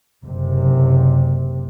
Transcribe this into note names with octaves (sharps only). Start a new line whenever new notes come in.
F#1 C3